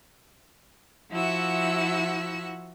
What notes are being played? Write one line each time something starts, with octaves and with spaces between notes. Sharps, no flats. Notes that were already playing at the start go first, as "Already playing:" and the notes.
F3 E4 F#4 E5 F#5 E6